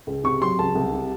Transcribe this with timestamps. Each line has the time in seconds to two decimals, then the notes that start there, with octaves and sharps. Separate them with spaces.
0.07 C#2
0.24 C3 C#6
0.42 F#3 C6
0.59 C#2 A5
0.75 C2
0.92 C3